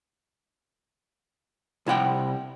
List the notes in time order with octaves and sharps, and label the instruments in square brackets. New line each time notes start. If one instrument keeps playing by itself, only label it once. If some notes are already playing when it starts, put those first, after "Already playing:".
[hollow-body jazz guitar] C2 E4 F#5 G5